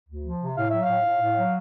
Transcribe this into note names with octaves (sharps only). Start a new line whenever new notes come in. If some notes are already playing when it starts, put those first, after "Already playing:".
D2
F3
C3
A2 F5
F#3 E5
F5
A2
A2
A2
F#3